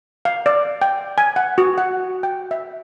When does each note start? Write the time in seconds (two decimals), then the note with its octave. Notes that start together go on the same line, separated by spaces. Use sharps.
0.25 F5
0.46 D5
0.82 G5
1.18 G#5
1.36 F#5
1.58 F#4
1.78 F#5
2.23 G5
2.51 E5